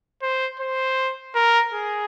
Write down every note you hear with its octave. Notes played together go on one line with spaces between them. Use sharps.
C5
C5
A#4
G#4